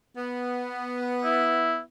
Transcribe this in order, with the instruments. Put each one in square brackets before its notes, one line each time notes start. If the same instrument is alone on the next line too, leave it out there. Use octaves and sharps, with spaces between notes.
[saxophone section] B3
[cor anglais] E4